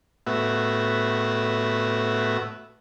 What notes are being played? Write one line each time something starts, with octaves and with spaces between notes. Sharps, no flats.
A2 B3 F#4 E5